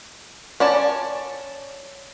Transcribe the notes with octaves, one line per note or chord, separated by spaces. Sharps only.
C#4 D5 A5